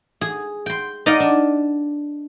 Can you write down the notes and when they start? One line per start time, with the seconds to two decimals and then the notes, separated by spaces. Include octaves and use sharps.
0.21 G#4
0.66 G5 C6
1.06 D#4 D5 D#5 F5 F#5
1.20 D4